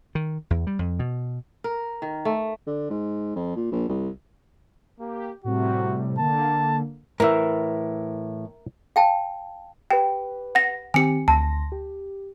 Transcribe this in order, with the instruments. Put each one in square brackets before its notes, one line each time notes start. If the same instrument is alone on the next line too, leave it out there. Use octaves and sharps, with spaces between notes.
[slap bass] D#3
E2
G3
F2
B2
[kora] A#4
D#3
A3
[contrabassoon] D3
G#2
F2
A#2
A#1
C2
[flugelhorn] A#3 [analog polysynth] G4
[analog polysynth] A2 C3 G3 [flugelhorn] F#4
[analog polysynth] D3 A#3 [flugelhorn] A5
[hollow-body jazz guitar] A2 E3 [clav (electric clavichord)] A#4 E5
[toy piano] F5 G5 A5
[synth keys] G4 B4 [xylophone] G5
[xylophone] F#5 A#6
[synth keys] D#3 C4 G4 [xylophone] G#5 C#7
[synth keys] D2 C6 A#6 [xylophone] A5
[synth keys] G4